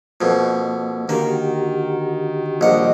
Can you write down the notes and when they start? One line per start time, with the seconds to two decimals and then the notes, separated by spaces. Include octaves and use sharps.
0.21 F2 B2 A#3
1.09 D3 D#3 A#3 F#4 G4
2.61 A#1 G3 D#5 F#5